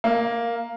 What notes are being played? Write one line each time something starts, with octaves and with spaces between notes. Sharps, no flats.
A#3